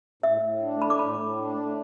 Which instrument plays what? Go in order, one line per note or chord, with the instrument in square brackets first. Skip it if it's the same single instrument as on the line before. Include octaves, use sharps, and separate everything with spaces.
[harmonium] A2 [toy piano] E5
[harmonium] A2
D4
[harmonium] A3 [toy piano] B5
[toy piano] D6
[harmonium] A2 [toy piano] B5
[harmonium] A2
D4
A3